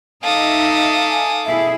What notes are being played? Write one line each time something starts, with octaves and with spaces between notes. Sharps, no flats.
D#4 A4 E5 F5 D6 D#6
G#5
B2 E4 G#4 E5